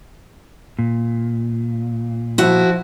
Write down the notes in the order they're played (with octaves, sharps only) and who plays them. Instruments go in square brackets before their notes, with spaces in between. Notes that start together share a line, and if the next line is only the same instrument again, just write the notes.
[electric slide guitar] A#2
[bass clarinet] F3 [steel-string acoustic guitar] E4 F#4